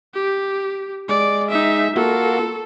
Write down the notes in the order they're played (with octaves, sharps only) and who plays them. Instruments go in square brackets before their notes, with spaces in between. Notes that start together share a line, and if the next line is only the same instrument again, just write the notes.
[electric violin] G4
[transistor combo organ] G#3 [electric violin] D5
[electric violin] D#4 E5
[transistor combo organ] A#3 F4 F#4 [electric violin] A4